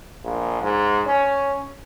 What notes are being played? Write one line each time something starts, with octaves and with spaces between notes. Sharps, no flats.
A#1
G#2
C#4